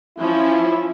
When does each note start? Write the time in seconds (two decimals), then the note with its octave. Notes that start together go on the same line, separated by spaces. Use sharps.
0.18 F3 C#4 E4